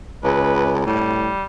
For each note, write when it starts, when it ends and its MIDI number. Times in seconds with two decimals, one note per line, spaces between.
0.24 0.86 37
0.24 0.73 71
0.86 1.31 45
0.86 1.44 55